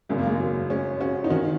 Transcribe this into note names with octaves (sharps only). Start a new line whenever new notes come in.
G#1 F#2 C#3 G#3
A#3
G#3
F#3 A#3
G#3 C#4
C#4 F#4
D#4
D#3 C#4 F#4